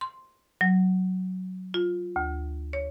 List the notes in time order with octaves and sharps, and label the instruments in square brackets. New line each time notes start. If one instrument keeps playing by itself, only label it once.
[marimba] C6
F#3
F4
D2
C#5